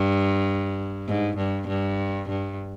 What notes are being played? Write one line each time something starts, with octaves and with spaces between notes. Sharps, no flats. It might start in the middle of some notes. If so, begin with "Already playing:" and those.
Already playing: G2
G#2
G2
G2
G2